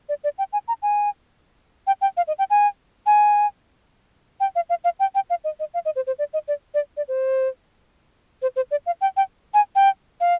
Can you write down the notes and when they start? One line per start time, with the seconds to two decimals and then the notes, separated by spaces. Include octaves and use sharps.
0.09 D5
0.24 D5
0.38 G5
0.53 G#5
0.68 A#5
0.82 G#5
1.87 G5
2.01 G5
2.17 F5
2.27 D#5
2.39 G5
2.50 G#5
3.06 G#5
4.40 G5
4.56 F5
4.69 F5
4.84 F5
5.00 G5
5.15 G5
5.30 F5
5.44 D#5
5.60 D#5
5.74 F5
5.85 D#5
5.96 C5
6.07 C5
6.19 D5
6.33 D#5
6.48 D5
6.74 D5
6.97 D5
7.08 C5
8.42 C5
8.56 C5
8.71 D5
8.86 F5
9.01 G5
9.17 G5
9.54 G#5
9.75 G5
10.20 F5